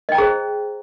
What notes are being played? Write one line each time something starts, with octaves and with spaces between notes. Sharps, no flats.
G#4 C5 D#5 G5 A#5